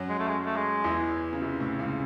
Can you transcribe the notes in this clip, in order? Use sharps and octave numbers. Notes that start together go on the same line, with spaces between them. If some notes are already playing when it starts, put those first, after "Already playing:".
Already playing: F#2 F#3
G#3
A3
G#3
A3
G#3
E2 E3
C#3
C3
A2
C#2 C#3